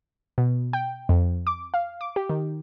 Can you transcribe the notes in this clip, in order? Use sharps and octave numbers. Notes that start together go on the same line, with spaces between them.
B2
G5
F2
D6
F5
D6
G4
D#3